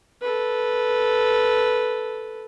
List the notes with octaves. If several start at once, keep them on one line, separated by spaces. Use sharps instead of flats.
A4 B4